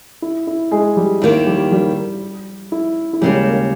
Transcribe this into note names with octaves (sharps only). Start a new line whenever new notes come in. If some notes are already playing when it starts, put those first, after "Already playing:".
E4
E4
G#3 G#4
G3 G4
D#2 D#3 A#3 E4
G3 G4
G3 G4
E4
E4
D#2 C#3 G3 G#3 G4
A#3 A#4